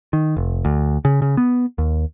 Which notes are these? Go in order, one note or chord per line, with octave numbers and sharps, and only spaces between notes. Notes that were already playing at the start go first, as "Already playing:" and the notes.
D#3
F1
D2
C#3
C#3
B3
D#2